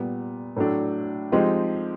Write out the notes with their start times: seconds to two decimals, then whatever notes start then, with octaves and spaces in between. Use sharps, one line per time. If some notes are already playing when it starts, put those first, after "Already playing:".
Already playing: A#2 G3 B3
0.56 A2 F#3 A3 D4
1.32 F3 G#3 C4 D#4 G4